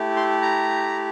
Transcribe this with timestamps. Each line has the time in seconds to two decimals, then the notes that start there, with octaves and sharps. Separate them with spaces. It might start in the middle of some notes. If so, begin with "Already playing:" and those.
Already playing: A3 E4 G4
0.16 C6
0.42 A#5